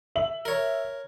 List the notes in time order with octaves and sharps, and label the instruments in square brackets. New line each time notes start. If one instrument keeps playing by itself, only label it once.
[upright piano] E5 F#7
[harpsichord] A#4 C#5